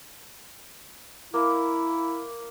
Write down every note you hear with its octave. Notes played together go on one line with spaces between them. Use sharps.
A#3 E4